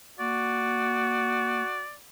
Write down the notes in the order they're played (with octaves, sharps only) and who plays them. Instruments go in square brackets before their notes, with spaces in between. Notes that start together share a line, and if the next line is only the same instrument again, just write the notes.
[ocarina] A#3 [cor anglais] F#4 [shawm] D5